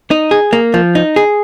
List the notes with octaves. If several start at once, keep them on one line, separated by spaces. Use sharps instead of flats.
D#4
G#4
A#3
F3
D#4
G#4